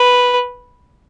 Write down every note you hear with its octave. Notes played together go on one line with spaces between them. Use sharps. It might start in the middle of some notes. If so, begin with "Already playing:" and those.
Already playing: B4